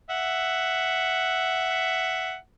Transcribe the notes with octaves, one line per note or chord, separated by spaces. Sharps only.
E5 F#5